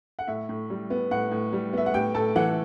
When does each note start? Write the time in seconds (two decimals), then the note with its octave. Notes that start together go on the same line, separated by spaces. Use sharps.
0.19 F#5
0.28 A2 E5
0.49 A2
0.70 G3
0.90 B3
1.11 A2 F#5
1.31 A2
1.53 G3
1.73 B3 E5
1.86 F#5
1.94 A2 G4 G5
2.14 A2 A4 A5
2.36 E3 F#5